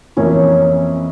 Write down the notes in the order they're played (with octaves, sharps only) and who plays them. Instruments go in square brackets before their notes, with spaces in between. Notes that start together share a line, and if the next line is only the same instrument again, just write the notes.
[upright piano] F2 E3 A#3 E4 [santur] C#4